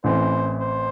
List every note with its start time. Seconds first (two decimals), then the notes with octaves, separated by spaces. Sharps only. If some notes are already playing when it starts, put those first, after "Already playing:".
0.04 A1 A2 E3 C4 C5
0.61 C5